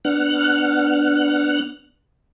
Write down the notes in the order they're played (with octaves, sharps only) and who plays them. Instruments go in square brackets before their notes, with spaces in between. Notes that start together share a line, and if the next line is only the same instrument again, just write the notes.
[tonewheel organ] B3 D4 F#5 F6 F#6